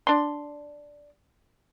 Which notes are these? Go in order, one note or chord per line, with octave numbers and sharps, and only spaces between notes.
D4 C6